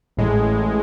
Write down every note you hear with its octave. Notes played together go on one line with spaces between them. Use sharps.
A1 A2 G#3